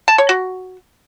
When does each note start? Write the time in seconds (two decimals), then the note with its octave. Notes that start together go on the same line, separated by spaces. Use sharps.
0.08 A5
0.18 C#5
0.29 F#4